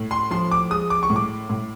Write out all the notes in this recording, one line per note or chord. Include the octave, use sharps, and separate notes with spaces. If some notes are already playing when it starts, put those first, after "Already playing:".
Already playing: A2
C6
F3 C6
D6
G#3 D#6
D6
C#6
A2
D6
A2